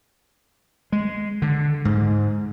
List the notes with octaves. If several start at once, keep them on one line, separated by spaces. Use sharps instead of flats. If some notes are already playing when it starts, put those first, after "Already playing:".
G#3
D3
G#2